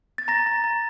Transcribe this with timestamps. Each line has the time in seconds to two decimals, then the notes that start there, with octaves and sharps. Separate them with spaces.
0.18 A6
0.28 A#5 A#6
0.46 A#5
0.64 A#5